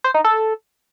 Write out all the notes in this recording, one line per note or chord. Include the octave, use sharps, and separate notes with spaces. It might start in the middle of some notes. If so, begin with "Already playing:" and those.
C5
D#4
A4